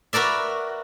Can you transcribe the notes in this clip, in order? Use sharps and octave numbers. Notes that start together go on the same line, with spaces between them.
F#4 A#4 B4 D5 E5